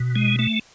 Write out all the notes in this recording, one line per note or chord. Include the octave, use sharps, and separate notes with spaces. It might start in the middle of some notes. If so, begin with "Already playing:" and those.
Already playing: B2
G#3
A3